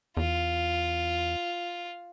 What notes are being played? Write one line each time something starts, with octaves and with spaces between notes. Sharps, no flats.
E2 F4